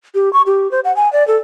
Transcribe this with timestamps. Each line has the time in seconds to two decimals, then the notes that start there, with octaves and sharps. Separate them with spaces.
0.15 G4
0.33 C#6
0.46 G4
0.71 C5
0.85 F#5
0.96 G#5
1.13 D5
1.28 A4